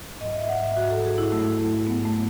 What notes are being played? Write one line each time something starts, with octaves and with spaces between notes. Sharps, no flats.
G#2 F#3 D#5
E5
F#5
E5
G#2 F#3 F#4
A4
G#4
E4
G#2 F#3 A3
G#2 F#3 B3
A3